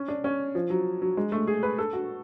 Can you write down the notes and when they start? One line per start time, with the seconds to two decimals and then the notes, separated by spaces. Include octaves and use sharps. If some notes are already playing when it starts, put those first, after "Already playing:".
Already playing: C#4
0.08 D4
0.24 C#4
0.55 F3
0.70 F#3
1.02 F#3
1.17 G#3
1.32 A3
1.47 G#4
1.63 B4
1.78 A4
1.93 F#4